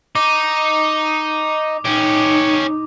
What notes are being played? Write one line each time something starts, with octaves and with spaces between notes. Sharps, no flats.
D#4 D6
C#4 D#4 G4